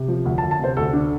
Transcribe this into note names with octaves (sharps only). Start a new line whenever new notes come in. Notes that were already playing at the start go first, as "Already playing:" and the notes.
Already playing: C3
F3
D2
A5
D2
A5
C3 C5
D2 A4
D3 D4